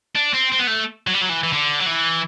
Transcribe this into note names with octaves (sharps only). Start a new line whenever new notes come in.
D4
C4
C4
B3
A3
F#3
G3
F#3
E3
E3
D3
F#3
E3